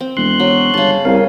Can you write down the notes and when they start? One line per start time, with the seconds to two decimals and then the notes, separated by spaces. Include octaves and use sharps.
0.01 C4
0.17 E1 C6 F#6
0.40 F#3
0.74 G1 C#3 A5
1.05 C2 A#4 F5